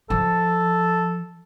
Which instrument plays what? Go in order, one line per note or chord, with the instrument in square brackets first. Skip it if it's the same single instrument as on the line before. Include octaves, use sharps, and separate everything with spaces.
[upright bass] F3 [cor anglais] A4